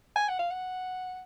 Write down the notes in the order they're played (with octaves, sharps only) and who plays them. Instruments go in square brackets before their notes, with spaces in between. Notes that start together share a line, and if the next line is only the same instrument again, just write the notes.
[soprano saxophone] G#5
F#5
F5
F#5